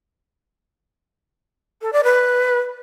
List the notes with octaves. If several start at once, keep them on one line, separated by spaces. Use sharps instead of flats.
A4
D5
B4